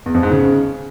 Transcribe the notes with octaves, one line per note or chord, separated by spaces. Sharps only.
E2
F2
G#2
C#3